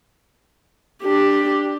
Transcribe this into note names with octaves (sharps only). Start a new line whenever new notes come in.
D4 G4